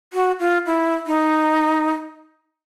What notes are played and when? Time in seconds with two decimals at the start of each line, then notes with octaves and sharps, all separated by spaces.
0.13 F#4
0.40 F4
0.66 E4
1.07 D#4